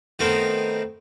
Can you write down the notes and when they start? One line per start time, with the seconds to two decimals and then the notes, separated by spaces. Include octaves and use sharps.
0.19 D#3 A3 B3 C4 A#4 C5